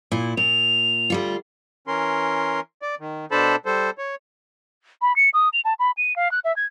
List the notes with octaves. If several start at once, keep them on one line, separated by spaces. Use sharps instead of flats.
A#2 E4
A#2 F7
D2 G3 F4
E3 C#4 A#4 C6
D5
D#3
B2 D4 A4 C5 A5 B5
G3 A4 C5
C#5
B5
C#7
D#6
F7
A5
B5
D#7
F5
F#6
E5
G#6